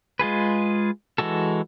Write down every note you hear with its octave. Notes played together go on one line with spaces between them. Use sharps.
G#3 F4 G#4 B4
E3 G#3 F#4 A4